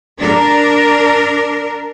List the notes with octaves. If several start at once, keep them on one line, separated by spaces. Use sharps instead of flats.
D4 A#4